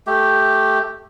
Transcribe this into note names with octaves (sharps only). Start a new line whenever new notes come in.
A3 G4